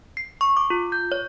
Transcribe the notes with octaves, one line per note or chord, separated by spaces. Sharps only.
C7
C#6
D6
F4
G6
C#5